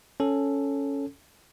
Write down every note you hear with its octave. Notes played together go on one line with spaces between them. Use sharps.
C#4 A4